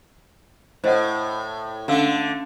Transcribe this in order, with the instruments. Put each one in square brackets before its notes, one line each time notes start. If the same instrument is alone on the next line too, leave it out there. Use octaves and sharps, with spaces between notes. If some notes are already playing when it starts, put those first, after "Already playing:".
[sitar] A2 [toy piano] C5 D#5 F#5
[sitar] D3 A3 [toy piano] C#4 F5 E6